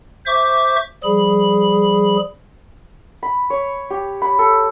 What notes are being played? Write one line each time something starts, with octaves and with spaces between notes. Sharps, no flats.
C5 E5 C#6 D6
F3 G3 G#4 B5
B5
C#5
G4
B5
A4